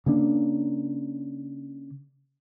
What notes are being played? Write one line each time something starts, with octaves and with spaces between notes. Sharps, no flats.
C#3 A#3 D4